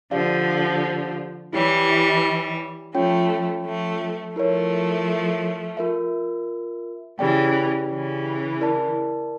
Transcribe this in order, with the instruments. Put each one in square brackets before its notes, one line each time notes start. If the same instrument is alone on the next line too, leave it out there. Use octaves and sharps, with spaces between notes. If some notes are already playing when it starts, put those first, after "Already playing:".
[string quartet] D3 F3 [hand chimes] G4 D5 F5
[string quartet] E3 G3 [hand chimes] E4 G4 C#5
[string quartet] F3 A3 [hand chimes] C#4 F4 C#5 G5
[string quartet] F3 A3
[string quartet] F3 A3 [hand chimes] E4 A#4 C#5
[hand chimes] F4 A#4 E5
[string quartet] C#3 E3 [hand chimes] G4 D5 G5
[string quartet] C#3 E3
[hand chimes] E4 A#4 D5 A5